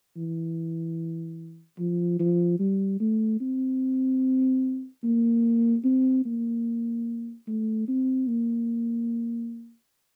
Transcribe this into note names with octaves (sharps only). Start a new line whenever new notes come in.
E3
F3
F3
G3
A3
C4
A#3
C4
A#3
A3
C4
A#3